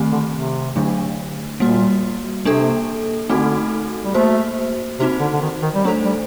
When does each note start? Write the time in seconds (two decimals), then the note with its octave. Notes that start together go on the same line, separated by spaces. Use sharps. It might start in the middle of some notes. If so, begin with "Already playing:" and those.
Already playing: D#3 A3 C4 G4
0.12 D3
0.34 C3
0.76 D3 F#3 A3 D4
1.60 A#2 G3 A#3 F#4
2.45 C3 A#3 D4 A4
3.29 D3 A3 C4 D#4 F#4 A4
4.05 G3
4.14 A3 A#3 F#4 C5
4.99 C3 C4 D#4 F#4 C5
5.20 D3
5.33 D3
5.42 D#3
5.62 D#3
5.75 G3
5.84 F#3 A3 D4 A4 C5
6.05 G3